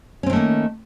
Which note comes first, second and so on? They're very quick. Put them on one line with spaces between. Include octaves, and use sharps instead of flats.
C#4 C4 D#3 A3 A#3